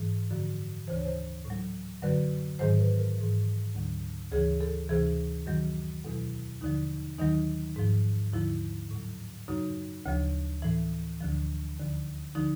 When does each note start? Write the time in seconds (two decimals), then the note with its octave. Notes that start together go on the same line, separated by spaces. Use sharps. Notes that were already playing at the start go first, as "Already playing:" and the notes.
Already playing: G#2 E3
0.31 F#2 D3 F3
0.87 D2 C#3 E3 C5
0.97 C#5
1.05 C5
1.45 A2
1.50 F#3
2.02 F#2 D3 F#3 B4
2.59 G#2 D#3 F#3 C5
2.79 B4
2.99 A#4
3.18 G#2 E3
3.74 D2 D3 F#3
4.32 D2 C#3 E3 G#4
4.61 A4
4.89 D2 C3 E3 G#4
5.46 F#2 D#3 F#3
6.04 E2 B2 F#3 A4
6.61 D#2 D3 F3 D#4
7.18 D#2 D#3 F#3 D#4
7.76 G#2 F3
8.33 D#2 D3 F3 E4
8.91 A2 F#3
9.48 F#2 C#3 F#3 D#4
10.06 D2 C#3 F3
10.62 A2 E3
11.20 D2 D3 F3
11.78 D#2 D3 F3
12.35 D3 F3 D#4